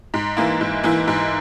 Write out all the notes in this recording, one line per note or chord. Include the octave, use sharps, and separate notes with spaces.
G#2
E3 A#3 E4
G#2
E3 A#3 E4
G#2